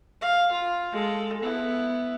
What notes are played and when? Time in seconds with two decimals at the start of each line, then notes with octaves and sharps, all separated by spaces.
0.21 F5
0.51 F4
0.92 G#3 A4
1.42 B3 E4